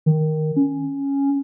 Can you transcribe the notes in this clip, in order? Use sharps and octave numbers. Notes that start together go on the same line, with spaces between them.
D#3
C#4